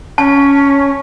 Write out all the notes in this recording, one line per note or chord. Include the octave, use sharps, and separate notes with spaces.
C#4 A5